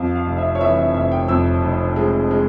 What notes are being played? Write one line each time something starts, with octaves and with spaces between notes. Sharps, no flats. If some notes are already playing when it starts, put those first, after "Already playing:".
Already playing: F2 F5
F5
F1
E5
C#5
E3 E5
E5
F1 E5
G5
F2 E6
F1
G#3
G#3